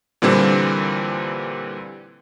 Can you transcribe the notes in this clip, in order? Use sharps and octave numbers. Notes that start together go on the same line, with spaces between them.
A#2 D3 E3 G3 C4